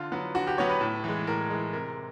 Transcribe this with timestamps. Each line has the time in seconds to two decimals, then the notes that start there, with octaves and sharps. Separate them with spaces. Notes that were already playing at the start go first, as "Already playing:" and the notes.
Already playing: D3 F4
0.12 F#3 B3
0.35 D3 F#4
0.47 G4
0.58 F#3 B3 C#5
0.70 B4
0.81 A2
1.04 E3 G#3
1.27 A2 A#4
1.50 E3 G#3
1.73 C3 A#4